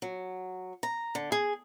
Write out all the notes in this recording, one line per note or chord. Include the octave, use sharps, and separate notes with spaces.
F#3
A#5
D3
G#4